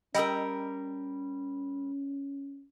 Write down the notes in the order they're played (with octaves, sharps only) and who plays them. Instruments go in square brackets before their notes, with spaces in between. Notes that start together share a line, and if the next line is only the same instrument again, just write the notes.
[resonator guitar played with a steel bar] G3 A#4 [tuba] C#4 [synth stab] D#5 G5 E6